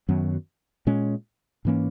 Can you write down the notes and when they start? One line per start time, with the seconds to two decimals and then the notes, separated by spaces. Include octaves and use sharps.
0.09 F#2 D#3 F#3 B3
0.87 A#2 G#3 C#4
1.65 G#2 E3 A#3 C#4